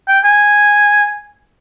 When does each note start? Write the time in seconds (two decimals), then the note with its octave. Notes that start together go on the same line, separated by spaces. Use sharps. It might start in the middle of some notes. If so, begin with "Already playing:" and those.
0.08 G5
0.25 G#5